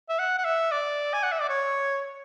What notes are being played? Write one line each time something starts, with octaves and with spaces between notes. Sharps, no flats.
E5
F#5
F#5
E5
D5
G#5
F#5
E5
D5
C#5